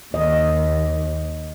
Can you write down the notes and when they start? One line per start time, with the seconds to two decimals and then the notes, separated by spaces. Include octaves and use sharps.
0.14 D#2 D#5